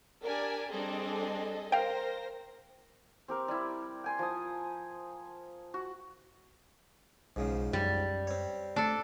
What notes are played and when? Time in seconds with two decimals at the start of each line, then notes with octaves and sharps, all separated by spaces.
0.23 D4 G4 A#4 D5 G#5
0.71 G3 C4 D4 G#4 A4 D#5
1.72 A#4 C5 F5 G5 A#6
3.28 C4 G4 A#4
3.48 G3 E4
4.04 G5 G#5 C6
4.19 F3 D#6
5.74 F#4
7.36 B1 G#2 C#3 F3
7.73 F#2 G3
8.27 C4 C#5
8.76 A3 D4 A4